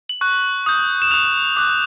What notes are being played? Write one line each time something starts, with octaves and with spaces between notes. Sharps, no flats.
F#7
C#6 F#6
D#6 G6
E7
D#6 F#6 F7
D6 F#6